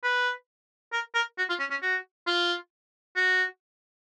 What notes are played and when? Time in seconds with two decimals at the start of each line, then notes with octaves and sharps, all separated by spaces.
0.04 B4
0.93 A#4
1.15 A#4
1.38 F#4
1.49 F4
1.60 C#4
1.71 C#4
1.82 F#4
2.27 F4
3.16 F#4